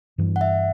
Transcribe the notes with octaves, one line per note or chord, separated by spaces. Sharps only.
G2 E3 B3 D4
F#5
E5